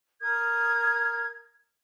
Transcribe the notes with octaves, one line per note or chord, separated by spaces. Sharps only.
A#4 D#6 G#6